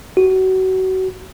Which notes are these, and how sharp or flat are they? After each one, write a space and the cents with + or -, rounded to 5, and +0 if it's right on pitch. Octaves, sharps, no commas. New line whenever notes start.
F#4 +30